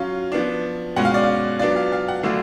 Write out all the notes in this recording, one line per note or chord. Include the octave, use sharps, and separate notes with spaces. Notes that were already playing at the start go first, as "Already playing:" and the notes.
Already playing: F#3 C#4 F4 F5
F3 B3 D4
B2 G#3 C#4 F#5
F5
D5
F5
F#3 B3 D4 F4 D5
F5
F5
F#5
D3 F#3 A3 D4 F5